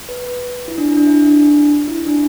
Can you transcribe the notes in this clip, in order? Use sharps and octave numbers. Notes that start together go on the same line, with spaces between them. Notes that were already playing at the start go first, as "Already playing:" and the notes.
B4
E4
D4
E4
D4
E4
D4
E4
D4